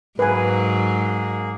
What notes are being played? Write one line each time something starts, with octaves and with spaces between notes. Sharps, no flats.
G#2 F#3 A#3 G#4 B4 G#5